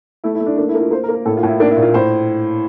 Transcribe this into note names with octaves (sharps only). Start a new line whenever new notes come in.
A3 E4
E4
A3
D4
A#3 D4
E4
A#3
F4
A#3 C5
A#4
A#3
A#4
A2 A4
F4
A2 E4
A#3 D4
E4
A#2
F4
A2 C5